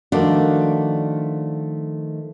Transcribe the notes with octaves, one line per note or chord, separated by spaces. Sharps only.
D#3 F3 A3 D4 F#4 D5